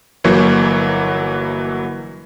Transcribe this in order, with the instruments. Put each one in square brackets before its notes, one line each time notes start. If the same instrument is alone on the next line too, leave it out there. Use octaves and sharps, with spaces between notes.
[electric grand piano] G1 E3 F#3 A#3 C#6